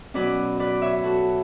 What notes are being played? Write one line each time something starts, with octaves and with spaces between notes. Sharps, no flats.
B2 F#3 C#4 B4 D5
B4 D5
C#5 E5
F#4 A4